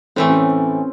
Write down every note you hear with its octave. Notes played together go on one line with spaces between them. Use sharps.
A2 E3 A3 C4
C#4